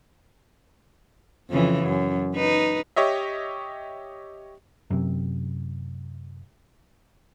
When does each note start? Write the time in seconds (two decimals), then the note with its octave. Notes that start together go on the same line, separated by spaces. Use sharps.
1.50 F2 C#3 E3
1.83 F#2
2.35 D#4 B4
2.96 G4 C#5 D#5 E5
4.90 F#2 C3